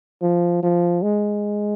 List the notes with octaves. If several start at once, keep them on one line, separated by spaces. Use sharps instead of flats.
F3
F3
G#3